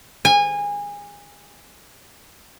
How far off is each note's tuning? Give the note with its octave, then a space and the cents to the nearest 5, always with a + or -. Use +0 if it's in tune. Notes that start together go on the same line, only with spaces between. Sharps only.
G#5 -25